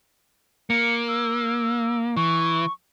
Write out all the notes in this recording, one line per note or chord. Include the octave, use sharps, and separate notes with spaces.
A#3 C#7
E6
E3 C#6